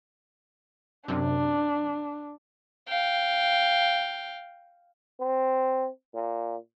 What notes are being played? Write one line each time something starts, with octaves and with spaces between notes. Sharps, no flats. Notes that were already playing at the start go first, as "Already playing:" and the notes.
F#2 C3 D4
F5 G5
C4
A#2